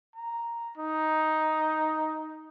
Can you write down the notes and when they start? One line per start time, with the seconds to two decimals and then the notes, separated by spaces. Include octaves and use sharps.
0.16 A#5
0.78 D#4